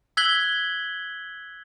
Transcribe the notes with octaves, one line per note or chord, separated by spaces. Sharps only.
E6 F#6 G#6 B6 F#7 G7